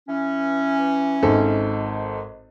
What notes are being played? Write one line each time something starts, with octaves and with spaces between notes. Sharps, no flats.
E3 C#4
G#1 G#2 A4